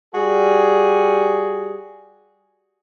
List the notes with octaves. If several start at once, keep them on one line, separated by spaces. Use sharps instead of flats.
G3 F#4 G#4